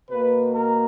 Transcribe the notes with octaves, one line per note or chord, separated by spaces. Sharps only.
B2 A#3 B4
A#4